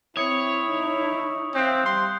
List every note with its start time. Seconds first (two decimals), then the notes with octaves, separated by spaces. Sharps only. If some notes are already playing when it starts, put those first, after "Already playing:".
0.17 C4 E4 C#5 D#6 C#7 F7
0.70 D#4
1.55 C4 E5 F5 D#6 F#6 G6
1.86 G3 C6